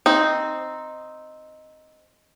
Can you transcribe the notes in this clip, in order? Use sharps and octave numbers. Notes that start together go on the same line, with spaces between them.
C4 D#4